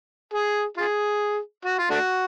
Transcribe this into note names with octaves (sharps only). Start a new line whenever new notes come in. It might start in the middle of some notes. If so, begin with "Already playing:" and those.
G#4
F4 G#4
F#4
F4
A3 D4 F#4